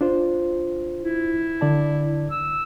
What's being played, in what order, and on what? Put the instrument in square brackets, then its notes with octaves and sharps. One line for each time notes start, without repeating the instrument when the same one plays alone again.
[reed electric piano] D4 F4 C5
[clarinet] E4
[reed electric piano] D3 D5 A5
[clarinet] E6